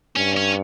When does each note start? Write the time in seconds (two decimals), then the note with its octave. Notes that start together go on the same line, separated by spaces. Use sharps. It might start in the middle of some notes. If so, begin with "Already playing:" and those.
0.16 G2 C#4
0.37 C#4